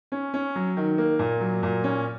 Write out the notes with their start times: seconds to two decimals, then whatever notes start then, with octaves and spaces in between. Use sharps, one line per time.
0.12 C#4
0.34 C#4
0.55 F#3
0.77 D#3
0.98 A#3
1.19 A#2
1.41 F#3
1.63 A#2
1.84 C#4